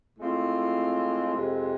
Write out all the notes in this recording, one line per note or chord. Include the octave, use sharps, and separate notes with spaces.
A2 G#3 C4 F4
F2 C3 G#3 C4